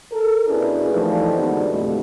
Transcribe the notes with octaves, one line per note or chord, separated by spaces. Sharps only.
A4 A#4
B2 C#4 D4 E4 G#4 B4
E3 F3 G3 A3 A#3 D#4
D3 G3 G#3 B3 D#4 F#4
F2 B2 F#3 G3 A3